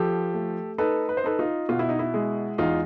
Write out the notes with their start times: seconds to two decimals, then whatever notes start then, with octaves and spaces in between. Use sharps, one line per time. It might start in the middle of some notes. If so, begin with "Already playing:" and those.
Already playing: F3 G4 A4
0.34 A3
0.78 D#4 A4 B4
1.09 B4
1.17 C5
1.24 D#4 A4 B4
1.39 D#4 F4
1.69 B2 F4
1.79 E4
1.89 D#4
1.99 E4
2.14 G#3
2.58 E2 D#4 F4